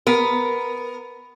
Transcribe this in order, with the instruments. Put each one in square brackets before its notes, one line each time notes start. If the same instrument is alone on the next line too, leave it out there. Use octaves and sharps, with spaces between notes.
[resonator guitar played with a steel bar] B3 A#4